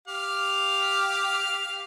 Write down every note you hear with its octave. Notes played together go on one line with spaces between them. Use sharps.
G4 F5